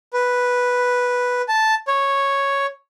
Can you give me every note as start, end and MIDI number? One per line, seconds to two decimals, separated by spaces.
0.13 1.42 71
1.48 1.75 81
1.88 2.66 73